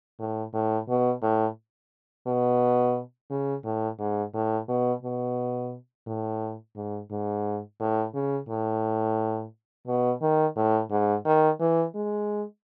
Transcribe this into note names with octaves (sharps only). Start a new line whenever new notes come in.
A2
A2
B2
A2
B2
C#3
A2
G#2
A2
B2
B2
A2
G#2
G#2
A2
C#3
A2
B2
D#3
A2
G#2
D#3
E3
G#3